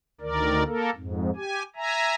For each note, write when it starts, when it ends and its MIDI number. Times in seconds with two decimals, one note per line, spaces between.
0.21 0.63 38
0.21 0.63 51
0.21 0.63 70
0.21 0.63 74
0.66 0.90 58
0.66 0.90 69
0.66 0.90 70
0.95 1.30 41
0.95 1.30 44
1.36 1.63 67
1.36 1.63 80
1.76 2.15 76
1.76 2.15 80
1.76 2.15 82